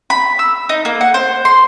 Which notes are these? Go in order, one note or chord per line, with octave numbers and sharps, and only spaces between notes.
B5
E6
D#4
A#3
F#5
C5
C6